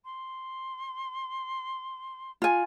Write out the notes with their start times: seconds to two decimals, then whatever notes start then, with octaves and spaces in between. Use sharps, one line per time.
0.05 C6
2.42 F4 G#5